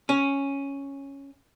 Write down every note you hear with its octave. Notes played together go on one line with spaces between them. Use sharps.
C#4